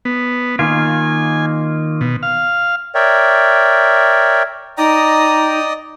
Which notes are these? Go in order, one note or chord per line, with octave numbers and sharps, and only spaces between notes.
B3
D#3 A#3 F4 G#5
B2
F5
A#4 C#5 D5 E5 G5
D#4 D5 D#5 G5 A#5 D#6